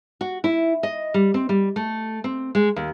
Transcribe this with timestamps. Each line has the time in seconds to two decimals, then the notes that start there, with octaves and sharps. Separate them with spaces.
0.21 F#4
0.44 E4
0.83 D#5
1.14 G3
1.34 C4
1.49 G3
1.76 A3
2.24 C4
2.55 G#3
2.76 D#2